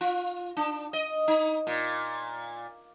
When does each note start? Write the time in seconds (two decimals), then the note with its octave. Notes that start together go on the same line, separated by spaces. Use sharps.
0.01 F4
0.57 D4
0.93 D#5
1.28 D#4
1.67 A#2